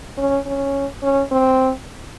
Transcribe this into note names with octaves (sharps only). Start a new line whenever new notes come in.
C#4
C#4
C#4
C4